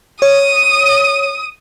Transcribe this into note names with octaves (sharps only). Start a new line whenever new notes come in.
C#5 D#6